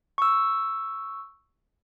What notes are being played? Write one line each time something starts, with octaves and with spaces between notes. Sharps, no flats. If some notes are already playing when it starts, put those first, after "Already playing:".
C#6 E6